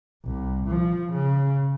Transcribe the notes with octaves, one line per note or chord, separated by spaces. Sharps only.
C2
F3
C#3